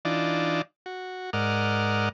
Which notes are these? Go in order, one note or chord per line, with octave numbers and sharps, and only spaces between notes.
E3 D4 D#4 F4 D5
F#4
G#2 A#4 D5 D#5 F#5 F6